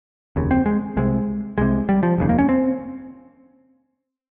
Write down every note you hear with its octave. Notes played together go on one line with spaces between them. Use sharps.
F1 D#2 C#3
C4
G#3
C2 C3 G#3
C2 C3 G#3
G3
F3
F1 D#2 C#3
A#3
C#4
C4